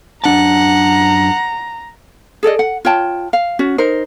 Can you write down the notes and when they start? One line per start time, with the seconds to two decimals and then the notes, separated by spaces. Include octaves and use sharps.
0.24 F#2 D4 F#5 A5 A#5
2.43 G#4 A4 D5 D#5
2.59 F#5
2.85 F4 C#5 G5 A5
3.33 F5
3.59 C#4 F#4
3.78 D#4 A#4 C5